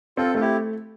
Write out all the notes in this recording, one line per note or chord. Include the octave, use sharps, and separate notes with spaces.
C4 F4 A4
A3 F4
E4 G4